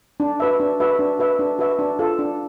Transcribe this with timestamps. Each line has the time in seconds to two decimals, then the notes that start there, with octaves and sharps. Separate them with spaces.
0.20 D4
0.40 F#4 B4 E5
0.60 D4
0.80 F#4 B4 E5
0.99 D4
1.19 F#4 B4 E5
1.39 D4
1.59 F#4 B4 E5
1.79 D4
1.99 F4 A4
2.19 D4